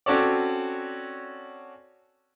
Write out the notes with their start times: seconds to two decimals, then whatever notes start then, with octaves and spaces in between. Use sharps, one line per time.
0.06 C4 C#4 F#4 A4 C#5 D5